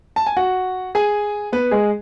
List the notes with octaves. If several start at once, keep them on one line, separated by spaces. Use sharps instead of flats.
A5
G#5
F#4 F#5
G#4 G#5
B3 B4
G#3 G#4